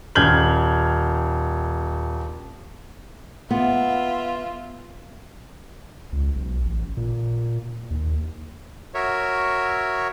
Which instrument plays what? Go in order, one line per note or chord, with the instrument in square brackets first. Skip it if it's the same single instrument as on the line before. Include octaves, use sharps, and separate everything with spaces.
[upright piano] D#1 F6 G6 G#6 F#7
[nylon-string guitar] B3 [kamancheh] F4 E5
[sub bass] C#2
B1
A1
A#2
D#2
[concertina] F#4 A#4 C#5 E5